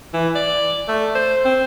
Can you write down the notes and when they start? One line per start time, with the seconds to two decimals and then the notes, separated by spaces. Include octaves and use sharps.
0.13 E3
0.35 D5
0.88 A3
1.15 C5
1.45 C4